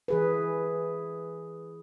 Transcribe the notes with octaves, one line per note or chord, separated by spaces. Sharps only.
E3 G#4 B4